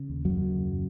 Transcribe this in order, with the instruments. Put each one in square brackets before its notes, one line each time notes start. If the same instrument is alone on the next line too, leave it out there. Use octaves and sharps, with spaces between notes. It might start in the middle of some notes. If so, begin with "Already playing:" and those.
Already playing: [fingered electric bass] C#3
D#2
F#2 F#3
C#3